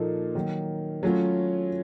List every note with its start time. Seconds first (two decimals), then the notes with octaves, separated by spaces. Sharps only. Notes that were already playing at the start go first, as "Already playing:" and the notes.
Already playing: A#2 F3 A#3 D#4 A4
0.35 D#3 F#3 A#3
1.03 F#3 A3 C#4 F4